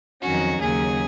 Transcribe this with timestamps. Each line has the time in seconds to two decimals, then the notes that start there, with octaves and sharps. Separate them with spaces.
0.21 F2 D#3 F#3 C#4 F#4
0.60 D#2 C#3 F#3 G#4